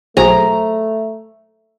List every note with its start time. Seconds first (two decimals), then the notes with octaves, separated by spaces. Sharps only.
0.17 B1 F#3 A3 G#4 C5 A#5